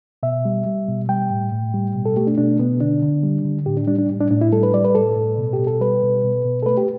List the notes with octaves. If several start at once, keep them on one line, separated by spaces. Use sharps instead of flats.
B2 E5
G3
G3
B2
G3 G5
A2
A2
G3
B2
A4
A3 G4
D4
B2 D4
B2 B3
D3 D4
D3
G3
D3
A2 G4
D4
G3 D4
D4
A2
D4
A2 D4
E4
G3 A4
B4
G3 D5
B4
A2 A4
A2
B2
G4
B2
A4
G3 B4
B2
B2
B2
A4
A3 B4
G4